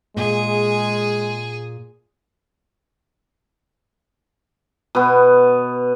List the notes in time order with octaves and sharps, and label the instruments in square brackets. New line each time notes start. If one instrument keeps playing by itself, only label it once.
[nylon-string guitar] A#2 [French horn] G#3 [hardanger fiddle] G#4
[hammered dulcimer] B2 B3